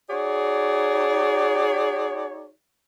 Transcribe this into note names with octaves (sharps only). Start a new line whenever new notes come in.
D#4 F#4 G#4 C#5 D5